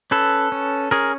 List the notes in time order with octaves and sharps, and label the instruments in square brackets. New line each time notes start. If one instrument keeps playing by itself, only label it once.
[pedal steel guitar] C#4 A4 B4
C#4
C#4 G#4 A#4